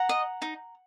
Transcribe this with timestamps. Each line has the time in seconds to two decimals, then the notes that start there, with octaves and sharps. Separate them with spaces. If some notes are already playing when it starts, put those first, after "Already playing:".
Already playing: F#5 A#5
0.09 D#5
0.42 D#4